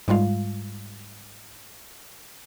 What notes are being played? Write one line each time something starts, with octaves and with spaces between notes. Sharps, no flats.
G#2 G3 G#3 F4 F5